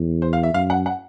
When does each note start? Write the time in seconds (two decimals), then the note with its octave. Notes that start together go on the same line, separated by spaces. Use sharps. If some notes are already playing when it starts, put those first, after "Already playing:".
Already playing: E2
0.22 C5
0.33 F5
0.43 E5
0.54 F#2 F5
0.70 F#5
0.86 F#5